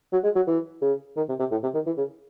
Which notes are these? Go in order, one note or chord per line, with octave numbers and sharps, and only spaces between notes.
F#3
G#3
F#3
E3
C#3
D#3
C3
C3
A2
C3
D#3
E3
C#3